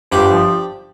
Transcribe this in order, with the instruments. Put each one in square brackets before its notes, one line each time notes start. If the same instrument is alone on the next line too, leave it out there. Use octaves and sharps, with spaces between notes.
[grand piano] G1 [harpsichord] D4 G4
[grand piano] F3